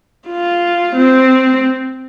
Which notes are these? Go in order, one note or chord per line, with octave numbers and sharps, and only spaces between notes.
F4
C4